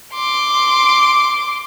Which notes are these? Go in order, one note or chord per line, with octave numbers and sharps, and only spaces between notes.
C6 D6